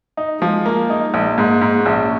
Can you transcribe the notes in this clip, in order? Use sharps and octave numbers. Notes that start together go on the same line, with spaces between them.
D#4
F3 G#3
A#3
D#4
A#1 A#3
G#2
G#2
A#1 C#4